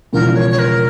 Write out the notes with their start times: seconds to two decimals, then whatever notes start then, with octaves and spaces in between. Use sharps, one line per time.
0.13 E1 E2 C#3 F3 A#4
0.35 C#5
0.50 C#5
0.58 A#4